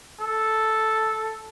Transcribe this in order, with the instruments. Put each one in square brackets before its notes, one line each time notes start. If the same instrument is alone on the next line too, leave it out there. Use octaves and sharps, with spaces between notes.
[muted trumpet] A4